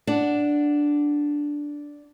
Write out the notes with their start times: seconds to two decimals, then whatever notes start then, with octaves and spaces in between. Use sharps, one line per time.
0.07 D4 F#5